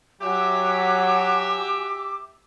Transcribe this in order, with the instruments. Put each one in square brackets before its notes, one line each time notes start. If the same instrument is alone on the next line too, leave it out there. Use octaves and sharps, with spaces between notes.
[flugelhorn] F#3 [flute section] F#4 G#5 [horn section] G4 E5 [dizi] D6